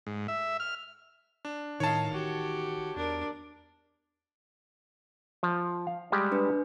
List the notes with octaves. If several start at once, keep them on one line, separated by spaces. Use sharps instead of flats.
G#2
E5
F6
D4
A2 D#3 D#4 C#5 F5 A5
A1 F#4 G4
E2 D4 A#4
F3
F5
G3 G#3 G4
D4 B4